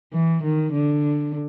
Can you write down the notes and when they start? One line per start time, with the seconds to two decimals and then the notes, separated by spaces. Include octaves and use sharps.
0.13 E3
0.43 D#3
0.73 D3